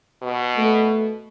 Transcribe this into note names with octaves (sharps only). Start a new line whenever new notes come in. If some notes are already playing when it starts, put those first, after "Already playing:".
B2
A3